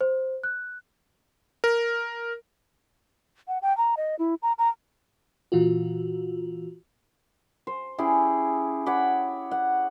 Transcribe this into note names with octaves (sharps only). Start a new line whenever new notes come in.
C5
F#6
A#4
F#5
G5
A#5
D#5
E4
A#5
A#5
A#2 E3 F4 F#4
C5
C#4 E4 G4 G#4
C#5 F#5 B5 D6
F#5